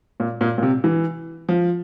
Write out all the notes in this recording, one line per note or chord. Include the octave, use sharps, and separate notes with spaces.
A#2
A#2
A#2
C3
E3
F3